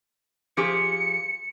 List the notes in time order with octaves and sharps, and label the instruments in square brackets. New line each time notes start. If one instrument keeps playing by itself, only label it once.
[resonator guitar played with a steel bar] F3 G4 G#4 [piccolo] C#7